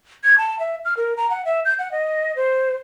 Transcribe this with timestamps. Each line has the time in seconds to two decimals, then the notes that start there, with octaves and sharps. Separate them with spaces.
0.24 G#6
0.38 A5
0.59 E5
0.85 F6
0.97 A#4
1.17 A#5
1.30 F#5
1.45 E5
1.65 G6
1.79 F#5
1.92 D#5
2.36 C5